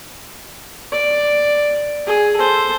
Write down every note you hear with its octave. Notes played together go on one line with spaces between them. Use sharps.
D5
G#4
A4 C5